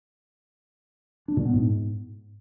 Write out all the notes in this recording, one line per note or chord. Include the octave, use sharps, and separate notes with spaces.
D4
A#2
B3
G#2